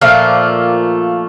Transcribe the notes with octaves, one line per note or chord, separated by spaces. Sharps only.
A#2 F3 A3 A#3